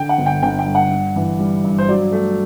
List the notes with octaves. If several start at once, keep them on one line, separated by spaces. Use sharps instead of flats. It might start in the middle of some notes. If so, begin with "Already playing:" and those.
Already playing: D3 G5
F#5
G1
G5
G1 G5
G5
G2
F#5
G2
E3
G3
G2
C5
F#3 D5
A3